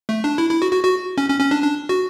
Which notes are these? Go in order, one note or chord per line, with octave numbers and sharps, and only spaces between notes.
A3
D4
E4
E4
F#4
F#4
F#4
C#4
C#4
C#4
D4
D4
F#4